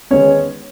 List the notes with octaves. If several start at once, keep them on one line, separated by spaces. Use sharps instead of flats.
D#3 G#3 B3 C#4 C#5